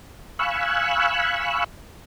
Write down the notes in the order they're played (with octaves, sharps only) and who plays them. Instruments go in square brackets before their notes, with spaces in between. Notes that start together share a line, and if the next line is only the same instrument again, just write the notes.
[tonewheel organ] F5 G#5 B5 C#6 E6 F#6